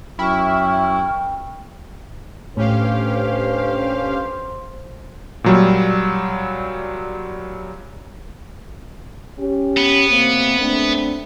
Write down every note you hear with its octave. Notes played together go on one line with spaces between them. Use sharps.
F#2 E4 G5 C#6 F6
A2 C#4 D4 G4 A4 B4 C5 F5
A#2 F#3 G3
C#4 G4
B3
C3 A#3 C4
A3 C4 D4